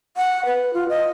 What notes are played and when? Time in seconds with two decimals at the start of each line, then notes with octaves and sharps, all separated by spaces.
0.17 F#5
0.45 B4
0.74 F4
0.89 D#5